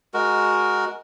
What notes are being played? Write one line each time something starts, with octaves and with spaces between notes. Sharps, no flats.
G#3 F#4 A#4